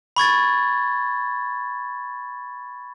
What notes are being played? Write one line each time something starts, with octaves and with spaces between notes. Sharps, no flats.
B5 C#6 G#6 A6